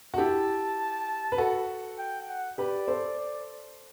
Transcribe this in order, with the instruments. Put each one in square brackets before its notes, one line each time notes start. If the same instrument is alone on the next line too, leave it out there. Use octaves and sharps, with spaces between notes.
[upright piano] F#4
[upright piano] E4 G4 [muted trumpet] A5
[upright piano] B4
F#4 A4
[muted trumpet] G5
F#5
[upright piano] G4 B4 [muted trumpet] D5
[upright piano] A4 C5